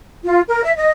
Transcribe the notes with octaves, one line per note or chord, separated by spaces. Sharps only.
F4
A#4
E5
D#5